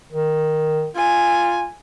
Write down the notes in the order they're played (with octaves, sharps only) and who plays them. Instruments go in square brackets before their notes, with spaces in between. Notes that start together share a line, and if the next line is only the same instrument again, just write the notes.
[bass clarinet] D#3
[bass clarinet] F4 [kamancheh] G#5